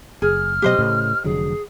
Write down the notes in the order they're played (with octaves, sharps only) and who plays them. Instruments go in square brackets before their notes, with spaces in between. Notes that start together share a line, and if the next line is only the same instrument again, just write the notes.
[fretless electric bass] F#1 [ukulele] G#4 [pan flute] F6
[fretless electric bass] B2 F#3 A3 [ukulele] G4 C5 D#5
[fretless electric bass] A2 C#3
[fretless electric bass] F1 D3 F#3 [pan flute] G#4